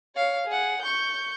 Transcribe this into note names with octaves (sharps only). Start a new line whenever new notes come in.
C#5 F5
G#4 F#5
C#6 G6